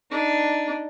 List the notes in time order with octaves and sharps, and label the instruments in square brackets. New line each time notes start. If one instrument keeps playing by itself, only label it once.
[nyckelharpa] D4 D#4